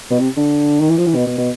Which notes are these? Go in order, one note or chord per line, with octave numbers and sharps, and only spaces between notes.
B2
C3
D3
D#3
E3
F3
E3
B2
B2
B2